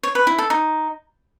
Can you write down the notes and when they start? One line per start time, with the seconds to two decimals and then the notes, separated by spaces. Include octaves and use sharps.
0.03 C#5
0.15 B4
0.27 E4
0.38 A4
0.50 D#4